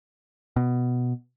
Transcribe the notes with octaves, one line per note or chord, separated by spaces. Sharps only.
B2